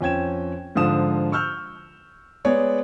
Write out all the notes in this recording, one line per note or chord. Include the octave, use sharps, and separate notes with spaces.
F2 C#4 G5 G#6 E7
G#2 D3 F3 F5 D#6 E7
C#6 E6 F6 G6
G#3 B3 G#4 C#5 D5